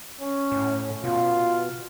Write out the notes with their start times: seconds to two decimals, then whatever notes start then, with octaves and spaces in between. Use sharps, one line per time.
0.20 C#4
0.52 A2
1.04 B2 F4